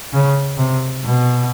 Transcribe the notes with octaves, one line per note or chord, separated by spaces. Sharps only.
C#3
C3
B2